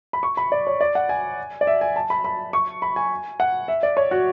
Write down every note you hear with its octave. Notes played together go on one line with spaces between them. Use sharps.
B5
C#6
B5
D5
C#5
D5
F#5
G#5
D5
E5
G#5
A5
B5
B5
C#6
B5
G#5
F#5
E5
D5
C#5
F#4